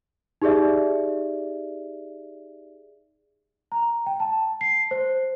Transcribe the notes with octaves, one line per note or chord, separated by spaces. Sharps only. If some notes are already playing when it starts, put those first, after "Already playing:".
D#4 G4 G#4 D5 E5
A#5
G5
A5
C7
C5